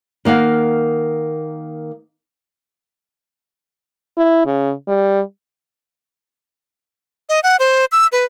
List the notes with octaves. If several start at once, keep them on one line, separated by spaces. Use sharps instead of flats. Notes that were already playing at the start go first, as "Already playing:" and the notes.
D#3 A#3 F5 F#5
E4
C#3
G3
D#5
F#5
C5
E6
B4